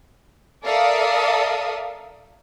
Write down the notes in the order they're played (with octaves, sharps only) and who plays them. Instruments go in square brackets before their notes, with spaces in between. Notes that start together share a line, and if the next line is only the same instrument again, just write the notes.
[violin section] A4 A#4 D5 E5 F5 D#6